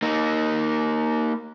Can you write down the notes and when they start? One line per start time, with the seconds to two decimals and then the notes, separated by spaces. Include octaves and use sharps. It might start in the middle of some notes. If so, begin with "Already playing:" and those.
0.02 A#3 D#4